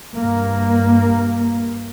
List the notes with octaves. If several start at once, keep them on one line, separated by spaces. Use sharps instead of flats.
G2 A#3